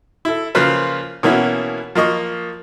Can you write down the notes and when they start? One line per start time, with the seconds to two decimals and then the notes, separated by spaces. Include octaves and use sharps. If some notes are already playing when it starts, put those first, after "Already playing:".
0.25 E4 A4
0.55 C#3 F3 A#3 F4 B4 C5
1.23 B2 E3 A#3 B3 C#4 E4
1.95 F3 A#3 D#5 C#6